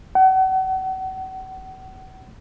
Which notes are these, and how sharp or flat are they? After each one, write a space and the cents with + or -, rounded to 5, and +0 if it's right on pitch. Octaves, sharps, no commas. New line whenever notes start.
F#5 +35